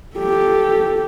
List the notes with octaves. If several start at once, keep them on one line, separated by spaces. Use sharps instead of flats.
G4 A4